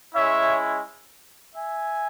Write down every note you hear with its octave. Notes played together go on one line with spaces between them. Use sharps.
G#3 C#4 E4 C#5 E5
E5 G#5